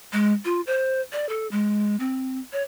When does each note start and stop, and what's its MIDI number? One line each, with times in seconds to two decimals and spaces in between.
0.13 0.33 56
0.45 0.61 65
0.67 1.00 72
1.12 1.28 74
1.29 1.47 69
1.51 1.96 56
2.00 2.40 60
2.53 2.63 73